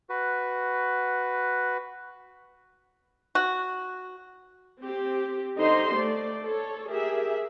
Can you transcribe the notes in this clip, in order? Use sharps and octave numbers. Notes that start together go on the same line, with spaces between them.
F#4 B4
F#4
C4 G4
D3 D#4 G4 C5 D#5 C6
A3 D5
A4 C#5
G4 G#4 A#4 E5